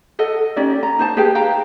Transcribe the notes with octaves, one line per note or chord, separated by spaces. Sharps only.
A4 D#5 F#5
C#4 D#4 G4 D5
A#5
D#4 C5 A5
G4 G#4 B4 G5
F5 G5 A#5